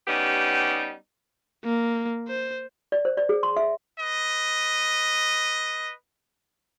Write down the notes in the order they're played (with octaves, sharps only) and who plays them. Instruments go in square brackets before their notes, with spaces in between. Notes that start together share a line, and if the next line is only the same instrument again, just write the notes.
[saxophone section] G3 B3 C#4 D#4 G4
[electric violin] A#3
C5
[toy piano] D5
C5
D5
G#4
C6
E5
[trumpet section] B4 D#5